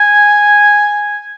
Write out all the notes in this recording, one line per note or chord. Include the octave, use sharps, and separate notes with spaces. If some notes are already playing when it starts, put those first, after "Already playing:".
Already playing: G#5